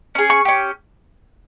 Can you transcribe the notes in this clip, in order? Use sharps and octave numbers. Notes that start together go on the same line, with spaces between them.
C#4 G#4
C#6
C#4 G4